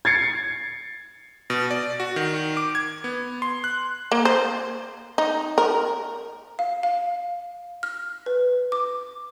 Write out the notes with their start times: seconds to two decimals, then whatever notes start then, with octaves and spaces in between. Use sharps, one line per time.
0.05 G#6 A6 C7 C#7
1.50 B2
1.71 D5
2.00 F#4
2.16 D#3
2.57 D6
2.75 G#6
3.04 B3
3.42 C6
3.64 F#6
4.11 A#3
4.25 C5
5.18 D#4
5.58 A#4
6.59 F5
6.83 F5
7.83 F6
8.26 B4
8.72 D6